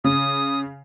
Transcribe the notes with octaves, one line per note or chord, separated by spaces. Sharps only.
C#3 D#6